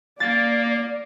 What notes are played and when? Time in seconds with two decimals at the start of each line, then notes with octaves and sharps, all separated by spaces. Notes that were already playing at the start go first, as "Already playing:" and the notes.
0.20 A#3 D5 A6